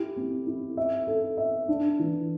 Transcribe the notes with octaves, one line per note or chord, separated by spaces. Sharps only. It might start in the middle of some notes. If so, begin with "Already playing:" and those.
Already playing: E4 G4
C4
E4
E5
A4
E5
D4
E3